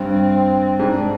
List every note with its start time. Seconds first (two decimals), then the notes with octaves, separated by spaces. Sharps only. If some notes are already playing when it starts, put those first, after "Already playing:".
Already playing: G2 C4
0.79 G#2 D4